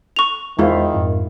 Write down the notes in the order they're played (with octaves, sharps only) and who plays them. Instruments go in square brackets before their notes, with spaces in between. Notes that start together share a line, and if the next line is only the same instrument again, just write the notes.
[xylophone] C#6 F7
[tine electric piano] E2 C5 [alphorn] D#3 [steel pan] G#3 E4 F4
[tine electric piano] F2 G#2